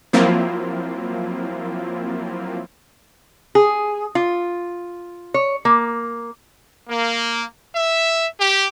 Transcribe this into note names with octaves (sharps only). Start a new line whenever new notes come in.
F3 F#3 A#3 C4 E4 F4
G#4
F4
C#5
A#3
A#3
E5
G4